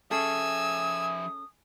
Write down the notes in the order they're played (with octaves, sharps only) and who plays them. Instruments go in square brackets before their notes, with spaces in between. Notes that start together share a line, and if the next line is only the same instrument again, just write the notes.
[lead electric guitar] F3 E5 [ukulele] C#4 G#4 A4 [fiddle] G#5 E6 [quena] D#6